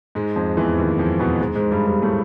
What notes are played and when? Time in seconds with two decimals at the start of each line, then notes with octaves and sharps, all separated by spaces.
0.15 G#2 G#3
0.36 F2 F3
0.57 E2 E3
0.78 D#2 D#3
0.99 F2 F3
1.19 B2 B3
1.40 G#2 G#3
1.56 G#2 G#3
1.71 G2 G3
1.86 G2 G3
2.02 A2 A3